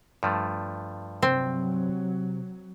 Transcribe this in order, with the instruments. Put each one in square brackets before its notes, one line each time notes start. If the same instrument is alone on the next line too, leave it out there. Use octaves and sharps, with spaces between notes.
[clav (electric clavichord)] G2 F3 A3
[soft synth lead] C3 [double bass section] F#3 [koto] C4